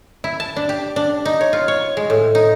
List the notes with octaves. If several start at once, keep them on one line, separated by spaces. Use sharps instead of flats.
E4
A5
D4
G4
D4
D#4
C#5
F4
C#5
G#3
A2
D#4